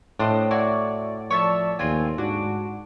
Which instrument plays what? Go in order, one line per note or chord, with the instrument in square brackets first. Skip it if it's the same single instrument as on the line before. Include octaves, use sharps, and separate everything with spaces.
[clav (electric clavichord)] A2 [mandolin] D4 C5 D#5
[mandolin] E4 F#4 [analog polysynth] D5
[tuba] F3 [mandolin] C#5 E5 A5
[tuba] D#2 [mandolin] C4 F4 G#5
[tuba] G#2 [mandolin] D4 [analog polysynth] F#4